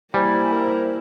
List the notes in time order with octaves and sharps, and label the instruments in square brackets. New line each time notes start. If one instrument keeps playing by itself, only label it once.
[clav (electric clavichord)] G3 [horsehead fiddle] A#3 E4 [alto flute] C5 [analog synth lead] G#5
[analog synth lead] A#4